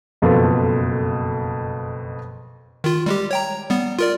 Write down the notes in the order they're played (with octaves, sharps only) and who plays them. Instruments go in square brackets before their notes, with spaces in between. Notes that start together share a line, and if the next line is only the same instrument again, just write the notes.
[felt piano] F#1 F2 B2 F4 A4 B4
[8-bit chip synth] D#3 F4
G3 G#3 G4
C#5 G5 A#5
G3 B3
F4 A#4 D5